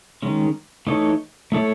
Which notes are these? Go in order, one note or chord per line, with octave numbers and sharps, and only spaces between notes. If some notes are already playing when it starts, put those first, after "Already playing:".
D#3 G#3 C#4
E3 A3 D#4 A4 C#5
A3 E4 A4 C#5